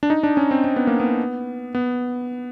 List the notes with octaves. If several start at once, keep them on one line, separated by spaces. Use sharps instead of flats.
D4
D#4
D4
C#4
C4
C4
B3
A#3
B3
B3